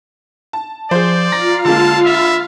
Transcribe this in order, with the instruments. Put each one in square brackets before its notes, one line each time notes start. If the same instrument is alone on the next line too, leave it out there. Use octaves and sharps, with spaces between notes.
[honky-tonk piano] A5
[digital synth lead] F3 [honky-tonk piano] G#4 C5 [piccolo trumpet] D5
[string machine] F4 F5 [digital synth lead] A#5 [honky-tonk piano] A#6
[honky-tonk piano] D3 G#3 A#3 [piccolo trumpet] A5
[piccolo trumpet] E5 [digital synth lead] B5